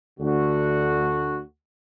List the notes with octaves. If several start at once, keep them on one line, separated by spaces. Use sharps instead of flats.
D2 D3 F#4